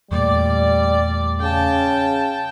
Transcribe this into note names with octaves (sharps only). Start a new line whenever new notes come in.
E2 A#2 G3 A3 D5
C#3 G5 A5